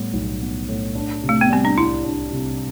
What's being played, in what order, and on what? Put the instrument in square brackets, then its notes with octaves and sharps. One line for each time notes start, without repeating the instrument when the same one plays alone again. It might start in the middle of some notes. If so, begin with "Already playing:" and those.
Already playing: [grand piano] A2 G3 B3
B1
B3
A2
D4
C3
[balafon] A3
B3
[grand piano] G3 [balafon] C4
[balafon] D4
[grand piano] C2 [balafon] E4
[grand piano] D4
C3